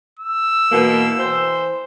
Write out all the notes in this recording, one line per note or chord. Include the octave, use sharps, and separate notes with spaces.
E6
B2 E3 A#3
E3 C5